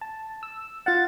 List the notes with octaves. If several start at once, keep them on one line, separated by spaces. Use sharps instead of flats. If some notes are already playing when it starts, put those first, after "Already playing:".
A5
E6
F4 F5 F#5 A6